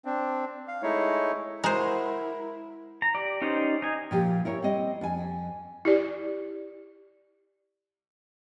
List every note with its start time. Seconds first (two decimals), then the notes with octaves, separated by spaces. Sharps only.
0.05 C4 D4
0.68 F5
0.83 G#3 A3 D#4 E4 C#5
1.64 G#3 E4 F#4 A#4 C5 A#5
3.02 A#5
3.15 G4 D5
3.42 C#4 D#4 G4 C5 D5
3.82 D#4 G#5
4.11 A#2 F3 G4
4.45 E4 A#4 C#5
4.62 G3 C4 D#5
5.01 F2 G#5
5.85 E4 G4 D5